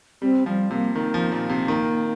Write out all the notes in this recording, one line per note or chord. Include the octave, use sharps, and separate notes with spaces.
G3 C4
F3 G3
C3 A#3
D#3 A#3
F3
A#2
C3
D#3